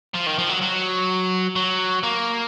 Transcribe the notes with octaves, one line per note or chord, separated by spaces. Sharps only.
F3
D#3
F3
F#3
F#3
F#3
A#3